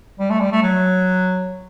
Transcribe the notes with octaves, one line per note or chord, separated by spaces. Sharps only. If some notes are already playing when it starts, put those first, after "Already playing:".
G3
A3
G3
A3
F#3